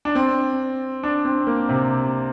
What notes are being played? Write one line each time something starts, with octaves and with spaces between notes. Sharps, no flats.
D4
C4
D4
C4
A#3
C3